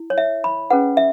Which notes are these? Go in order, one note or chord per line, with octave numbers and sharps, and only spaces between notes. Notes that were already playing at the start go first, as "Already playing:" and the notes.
Already playing: E4
C#5
E5
B5
C#4 G#4 B4 F#5
E5